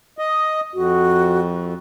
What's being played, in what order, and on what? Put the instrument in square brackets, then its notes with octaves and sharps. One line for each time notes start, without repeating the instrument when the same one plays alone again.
[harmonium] D#5
[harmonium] F2 [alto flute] F#4